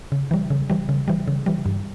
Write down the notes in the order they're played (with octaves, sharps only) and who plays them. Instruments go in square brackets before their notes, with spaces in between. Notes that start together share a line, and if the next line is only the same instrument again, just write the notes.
[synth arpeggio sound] C#3
E3 G3
C#3
E3 G3
C#3
E3 G3
C#3
E3 G3
G2